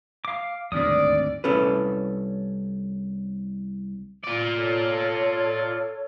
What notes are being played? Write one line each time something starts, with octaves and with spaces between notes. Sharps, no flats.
F5 D6
D#1 D2 G#2 D#3 C4 D5 D#6
C2 C#4 A4 B4
F4 D5
A4 C#5